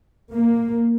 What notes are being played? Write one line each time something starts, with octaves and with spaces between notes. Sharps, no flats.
A#3